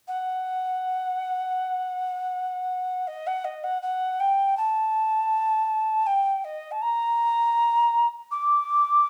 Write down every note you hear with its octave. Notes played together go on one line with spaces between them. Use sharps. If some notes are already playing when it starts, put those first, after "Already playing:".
F#5
D#5
F#5
D#5
F#5
F#5
G5
A5
G5
D#5
A5
A#5
D6